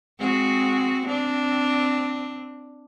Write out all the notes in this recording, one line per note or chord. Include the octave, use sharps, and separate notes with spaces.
G#3 C4 F#4
C4 D4